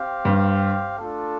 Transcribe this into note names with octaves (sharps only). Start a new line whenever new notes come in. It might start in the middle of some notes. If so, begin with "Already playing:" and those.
Already playing: C4 G4 F5
G2
A3 D4 F4 A4